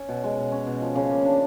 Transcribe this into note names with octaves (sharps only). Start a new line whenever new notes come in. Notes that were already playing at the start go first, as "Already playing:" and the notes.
Already playing: C#4
B2
G#3
B2
C#4
B2
F3
C#3
A#3
D4